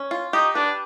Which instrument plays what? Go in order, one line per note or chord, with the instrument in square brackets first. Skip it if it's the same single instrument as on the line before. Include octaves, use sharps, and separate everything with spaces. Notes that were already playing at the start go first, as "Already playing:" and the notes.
Already playing: [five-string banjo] C#4
F4
[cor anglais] D#4 [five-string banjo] G4
[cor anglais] D4 [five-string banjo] B4